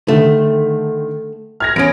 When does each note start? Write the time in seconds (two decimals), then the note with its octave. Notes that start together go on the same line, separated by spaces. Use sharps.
0.08 D3 D#3 A3
1.60 F6 G#6 A#6
1.76 E2 C#4 D7